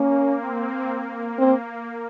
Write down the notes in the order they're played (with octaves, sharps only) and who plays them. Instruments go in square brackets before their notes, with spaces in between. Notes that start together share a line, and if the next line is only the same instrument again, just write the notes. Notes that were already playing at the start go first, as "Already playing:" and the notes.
Already playing: [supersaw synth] A#3 [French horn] C#4
[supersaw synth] C4
A#3
[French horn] C4